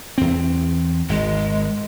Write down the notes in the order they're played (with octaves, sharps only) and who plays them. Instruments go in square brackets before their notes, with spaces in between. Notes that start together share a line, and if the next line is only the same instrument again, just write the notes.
[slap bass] E2 C4
[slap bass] G#1 [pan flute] G#3